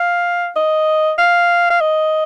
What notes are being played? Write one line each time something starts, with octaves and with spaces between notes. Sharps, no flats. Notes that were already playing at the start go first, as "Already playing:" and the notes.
Already playing: F5
D#5
F5
F5
D#5